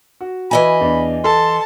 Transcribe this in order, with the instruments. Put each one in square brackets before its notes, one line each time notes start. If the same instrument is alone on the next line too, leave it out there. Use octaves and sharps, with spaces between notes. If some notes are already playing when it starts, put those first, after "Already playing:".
[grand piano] F#4
[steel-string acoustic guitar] E3 D#5 G#5 [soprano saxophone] B5
[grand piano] E2 D4
[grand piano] A4 [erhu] A5 [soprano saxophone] C6